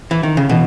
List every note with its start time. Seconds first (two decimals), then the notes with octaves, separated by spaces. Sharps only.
0.11 E3
0.23 D#3
0.37 C#3
0.49 B2 E3